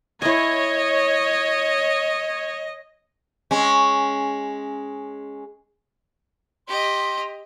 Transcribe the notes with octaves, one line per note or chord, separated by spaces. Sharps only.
E4 C#5 D#5 G#5
G#3 C#4
G4 D#5 C6